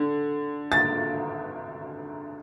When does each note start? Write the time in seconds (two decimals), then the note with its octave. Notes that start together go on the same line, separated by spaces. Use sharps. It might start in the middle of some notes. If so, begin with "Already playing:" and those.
Already playing: D3
0.72 A6